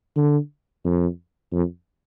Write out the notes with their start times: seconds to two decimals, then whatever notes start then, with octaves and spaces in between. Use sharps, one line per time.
0.17 D3
0.85 F2
1.53 F2